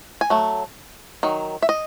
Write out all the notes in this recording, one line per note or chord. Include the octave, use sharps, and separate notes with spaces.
G#5
F#3 A3
D#3 F#3
E5
D#5